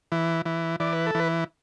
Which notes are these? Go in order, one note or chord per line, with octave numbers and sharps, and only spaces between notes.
E3
E3
E3 D5
B4
A4
E3 B4